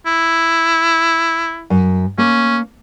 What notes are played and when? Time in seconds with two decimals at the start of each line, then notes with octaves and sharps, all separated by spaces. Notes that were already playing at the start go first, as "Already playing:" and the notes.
0.06 E4
1.70 F#2
2.18 A#3 C#4